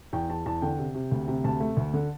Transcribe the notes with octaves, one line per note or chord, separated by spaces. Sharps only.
E2 G5
E2 A5
E2 A5
D3 G5
C3
C3
D2
C3
D2 A5
A3
D2
D3